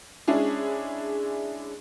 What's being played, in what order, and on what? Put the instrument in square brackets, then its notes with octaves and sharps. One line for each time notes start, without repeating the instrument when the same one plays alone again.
[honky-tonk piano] G#3 C#4 D4 E4 G#4